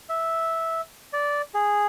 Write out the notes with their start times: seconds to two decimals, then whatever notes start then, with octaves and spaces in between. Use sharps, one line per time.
0.09 E5
1.13 D5
1.54 G#4